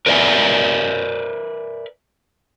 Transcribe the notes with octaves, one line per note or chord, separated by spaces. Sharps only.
A#4 B4 D5 E5 G#5